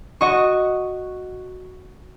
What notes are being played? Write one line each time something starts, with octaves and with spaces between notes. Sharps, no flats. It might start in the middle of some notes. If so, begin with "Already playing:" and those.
F#4 D#5 C#6